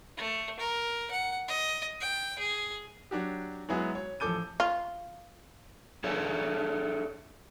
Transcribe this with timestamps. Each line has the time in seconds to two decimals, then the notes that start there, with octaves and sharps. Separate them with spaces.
0.17 A3
0.60 A#4
1.11 F#5
1.48 D#5
2.01 G5
2.39 G#4
3.11 F#3 D4 F#4 G4
3.69 F#3 G#3 B3 E4 F#4 G#4
3.95 C#5
4.20 A1 F3 A4 D6 G6 D#7
4.60 F4
6.04 D4 G#4 A4 C#5 D5 E5